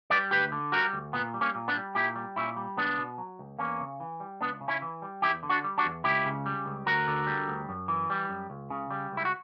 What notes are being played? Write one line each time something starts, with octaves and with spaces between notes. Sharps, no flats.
G3 B4 D5
D2 G4 B4
D3
G3 F#4 A#4
D2
A#2 B3
G3
A#3 C#4
A#2
B3 D4
G3
A#2 E4 G4
G3
A#2 C#4 E4
G3
C#2 B3 D4
B2
F#3
C#2
E2 A#3 C#4
C#3
E3
G3
C#2 B3 D4
C#3
C#4 E4
E3
G3
E2 E4 G4
D3
D4 F#4
G3
D4 F#4
E2
C#2 E4 G4
C#3
G3
C#2
D2 F#4 A#4
D3
G3
D2
F#2
E3
G3
F#2
C#2
C#3
G3
C#2
E4
F#4